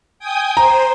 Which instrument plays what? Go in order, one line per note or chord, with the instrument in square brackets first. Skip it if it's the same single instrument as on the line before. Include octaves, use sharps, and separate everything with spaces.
[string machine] G5 G#5 D#6
[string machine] C5 [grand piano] A#5